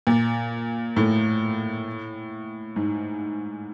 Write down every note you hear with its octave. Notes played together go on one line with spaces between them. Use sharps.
A#2
A2
G#2